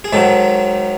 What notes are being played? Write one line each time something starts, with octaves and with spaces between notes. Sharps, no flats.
G#4
G#2 D#3 F#3 A4